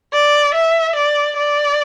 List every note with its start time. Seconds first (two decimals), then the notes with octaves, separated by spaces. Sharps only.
0.13 D5
0.54 E5
0.95 D5
1.37 D5